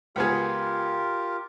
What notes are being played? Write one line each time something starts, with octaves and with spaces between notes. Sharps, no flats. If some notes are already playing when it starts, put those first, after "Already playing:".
C#2 B3 F4 G4 G#4 A#4